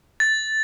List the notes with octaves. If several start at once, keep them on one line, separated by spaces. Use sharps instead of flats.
A6